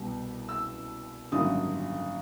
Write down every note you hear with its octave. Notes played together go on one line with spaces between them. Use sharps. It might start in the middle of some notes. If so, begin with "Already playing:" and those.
Already playing: C2 B2 G3
E6
G#1 F#2 D3 G3 A#3 D#6